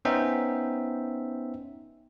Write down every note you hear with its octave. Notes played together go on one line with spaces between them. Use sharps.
B3 C#4 D#4 C5 E5 G5